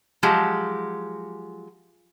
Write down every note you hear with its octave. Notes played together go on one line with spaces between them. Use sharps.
F3 F#3 G#3 G4